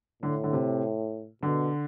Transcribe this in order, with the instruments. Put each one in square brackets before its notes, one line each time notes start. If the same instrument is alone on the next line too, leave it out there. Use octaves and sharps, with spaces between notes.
[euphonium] A2 [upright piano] D3
[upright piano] D3
C3
[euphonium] B2 [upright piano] D3